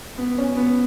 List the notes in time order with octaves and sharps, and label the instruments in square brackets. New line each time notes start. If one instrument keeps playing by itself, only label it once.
[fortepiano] B3
C#4
B3